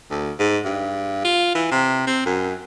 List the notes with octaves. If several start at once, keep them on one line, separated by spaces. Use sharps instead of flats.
D2
G#2
G2
F4
E3
C3
C4
F#2